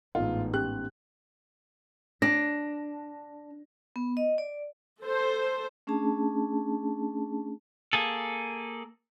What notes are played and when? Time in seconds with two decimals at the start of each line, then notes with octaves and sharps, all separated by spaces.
0.15 A1 G#2 B3 F4
0.54 C#4 G4 F#6
2.22 D4 A#6
3.96 B3
4.17 D#5
4.38 D5
5.02 A4 C5
5.87 A3 C#4 D4 G#4 A5
7.93 A#3 G#4 A4